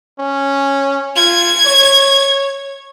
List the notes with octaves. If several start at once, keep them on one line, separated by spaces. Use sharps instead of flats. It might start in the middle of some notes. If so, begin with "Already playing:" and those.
C#4
F4 G#6
C#5